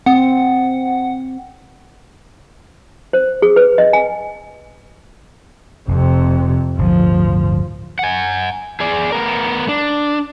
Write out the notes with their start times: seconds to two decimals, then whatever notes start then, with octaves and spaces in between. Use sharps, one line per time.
0.06 C4 F#5
3.13 C5
3.42 G#4
3.56 B4
3.78 D#5
3.93 G#5
5.88 F1 F2 C3
6.78 D1 G1 D2 F3
7.99 F#5 G#5
8.80 G#4 D5
9.12 B3 A#4
9.68 D4